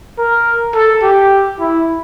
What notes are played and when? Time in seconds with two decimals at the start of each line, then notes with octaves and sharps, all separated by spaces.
0.19 A#4
0.75 A4
1.03 G4
1.60 E4